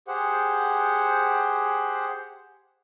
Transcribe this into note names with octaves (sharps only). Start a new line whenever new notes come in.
G4 G#4 C5 F#5